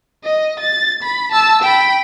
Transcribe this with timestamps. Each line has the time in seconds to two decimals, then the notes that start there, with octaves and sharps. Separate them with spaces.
0.24 D#5
0.60 A6
1.03 B5
1.32 A5 E6
1.62 G5 B5